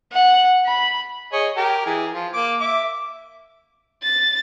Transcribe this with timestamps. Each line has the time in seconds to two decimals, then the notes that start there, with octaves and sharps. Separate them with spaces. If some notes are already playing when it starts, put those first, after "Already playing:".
0.12 F#5
0.67 B5
1.33 G#4 C#5 D#5
1.57 G4 A#4
1.86 E3 G#4
2.13 F3
2.34 A#3 D6
2.61 E5 D6
4.03 A6